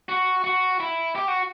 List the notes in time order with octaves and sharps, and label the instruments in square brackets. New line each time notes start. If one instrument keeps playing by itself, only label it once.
[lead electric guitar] F#4
F#4
E4
G4
F#4